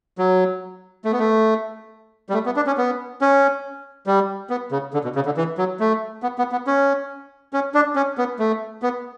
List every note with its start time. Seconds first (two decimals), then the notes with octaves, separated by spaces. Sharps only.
0.18 F#3
1.05 A3
1.12 B3
1.20 A3
2.29 G3
2.34 A3
2.46 B3
2.56 D4
2.67 C#4
2.78 B3
3.21 C#4
4.07 G3
4.50 B3
4.71 C#3
4.94 D3
5.04 B2
5.15 C#3
5.26 D3
5.37 E3
5.58 F#3
5.80 A3
6.23 B3
6.38 B3
6.52 B3
6.67 C#4
7.53 C#4
7.74 D4
7.96 C#4
8.18 B3
8.39 A3
8.82 B3